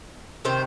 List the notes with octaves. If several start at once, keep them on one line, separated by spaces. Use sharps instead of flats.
C3 D#3 C5